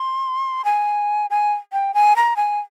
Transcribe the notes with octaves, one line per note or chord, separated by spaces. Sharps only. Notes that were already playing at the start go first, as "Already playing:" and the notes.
Already playing: C6
G#5
G#5
G5
G#5
A#5
G#5